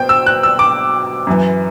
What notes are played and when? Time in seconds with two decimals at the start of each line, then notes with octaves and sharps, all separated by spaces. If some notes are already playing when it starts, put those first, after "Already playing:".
Already playing: B2 C5 G5
0.09 E6
0.26 F#6
0.43 E6
0.59 D6
1.27 F#2 E3